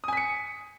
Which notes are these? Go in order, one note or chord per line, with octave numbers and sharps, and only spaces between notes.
G#5 D#6 B6 C#7